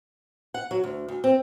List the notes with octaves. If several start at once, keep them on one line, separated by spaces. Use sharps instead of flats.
F#5
F#3
D2
D2
C4